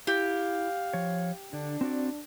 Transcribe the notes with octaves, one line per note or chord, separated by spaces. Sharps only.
E4 G4 F5
F3 C#5
D3 D4
C4 F#4 D5